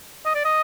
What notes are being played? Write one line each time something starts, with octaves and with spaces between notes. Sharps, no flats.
D#5
D5
D#5